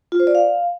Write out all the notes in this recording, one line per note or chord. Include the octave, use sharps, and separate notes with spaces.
F4
C5
D5
F5